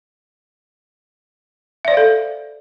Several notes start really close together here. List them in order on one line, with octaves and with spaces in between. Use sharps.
E5 D5 C5 F5 A4